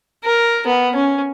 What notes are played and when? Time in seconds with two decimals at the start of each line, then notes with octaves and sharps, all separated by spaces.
0.24 A#4
0.67 B3
0.95 C#4